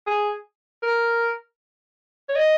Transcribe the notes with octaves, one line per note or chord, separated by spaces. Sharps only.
G#4
A#4
C#5
D#5